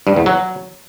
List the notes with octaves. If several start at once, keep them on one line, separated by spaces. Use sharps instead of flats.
G2
E2
F#3